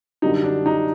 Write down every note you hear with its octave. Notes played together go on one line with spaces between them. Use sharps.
F#2 D3 G3 D#4
D4
D#4